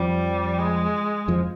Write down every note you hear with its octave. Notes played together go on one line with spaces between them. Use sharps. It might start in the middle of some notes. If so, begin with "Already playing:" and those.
Already playing: F2 F3 G3
G#3
F2 F3